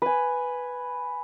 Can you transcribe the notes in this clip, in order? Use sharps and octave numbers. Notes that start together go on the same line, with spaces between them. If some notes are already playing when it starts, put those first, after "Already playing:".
B4 G#5